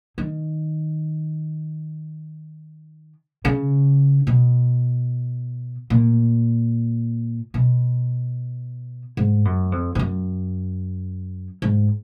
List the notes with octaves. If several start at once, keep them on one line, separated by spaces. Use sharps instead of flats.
D#3
C#3
B2
A#2
B2
G#2
F#2
F2
F2
F#2
G#2